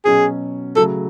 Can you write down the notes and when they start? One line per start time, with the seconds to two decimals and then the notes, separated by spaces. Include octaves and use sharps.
0.05 B2 F#3 C#4 G#4
0.76 C#3 F#3 A3 A4